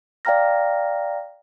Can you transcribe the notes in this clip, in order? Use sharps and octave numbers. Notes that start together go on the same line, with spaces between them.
D5 F5 G5 A#5 F6 A#6